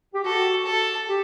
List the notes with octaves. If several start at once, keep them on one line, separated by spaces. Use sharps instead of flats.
G4
F#4 A4
A4
G4